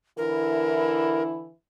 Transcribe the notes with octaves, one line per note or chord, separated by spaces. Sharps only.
D3 E3 E4 A#4